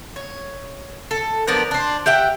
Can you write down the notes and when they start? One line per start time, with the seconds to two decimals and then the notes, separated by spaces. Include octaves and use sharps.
0.16 C#5
1.11 A4
1.47 F3 B3 D4 A#4
1.71 D4 C5
2.06 G4 E5 F#5 G5